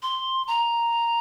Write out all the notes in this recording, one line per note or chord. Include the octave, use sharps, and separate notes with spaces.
C6
A#5